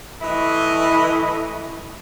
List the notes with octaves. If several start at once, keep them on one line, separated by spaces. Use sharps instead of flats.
E3 A3 E4 D#5